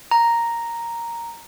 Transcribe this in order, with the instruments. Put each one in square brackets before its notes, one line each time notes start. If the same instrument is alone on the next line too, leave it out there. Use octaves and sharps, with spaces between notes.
[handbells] A#5